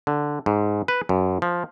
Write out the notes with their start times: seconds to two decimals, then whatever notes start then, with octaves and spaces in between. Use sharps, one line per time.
0.07 D3
0.46 G#2
0.88 B4
1.09 F#2
1.42 F3